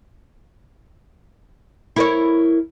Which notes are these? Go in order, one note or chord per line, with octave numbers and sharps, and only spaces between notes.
E4 A#4 C#5